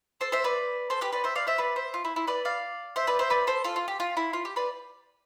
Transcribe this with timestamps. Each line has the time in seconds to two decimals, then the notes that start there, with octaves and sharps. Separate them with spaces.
0.21 A4 C5
0.32 C5 E5
0.44 B4 D5
0.90 A4 C5
1.01 G4 B4
1.12 B4 D5
1.24 C5 E5
1.35 D5 F5
1.47 C5 E5
1.58 B4 D5
1.76 C5 E5
1.94 F4
2.05 E4
2.16 E4
2.27 B4 D5
2.45 D5 F5
2.96 C5 E5
3.07 B4 D5
3.19 C5 E5
3.30 B4 D5
3.47 A4 C5
3.64 F4 A4
3.76 F4
3.88 G4
4.00 F4
4.17 E4
4.33 F4
4.45 G4
4.56 B4 D5